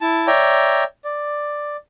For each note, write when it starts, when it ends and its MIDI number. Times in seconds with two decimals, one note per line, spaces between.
0.01 0.27 64
0.01 0.27 81
0.27 0.84 73
0.27 0.84 74
0.27 0.84 76
0.27 0.84 79
0.27 0.84 82
1.05 1.77 74